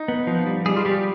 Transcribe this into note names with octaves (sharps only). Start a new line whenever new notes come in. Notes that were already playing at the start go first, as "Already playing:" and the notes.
Already playing: D#4
B3
F3
G3
G3 G#4
F4
G3 G4